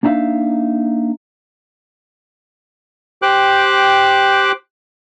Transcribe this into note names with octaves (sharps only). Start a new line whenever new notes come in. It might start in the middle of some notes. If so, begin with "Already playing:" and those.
A#3 D4 D#4 E5 F5
G4 C5 G5 D6 F#6